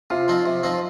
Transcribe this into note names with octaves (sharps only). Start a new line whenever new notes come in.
C3 F4
F3 C4 D#4
C3
F3 C4 D#4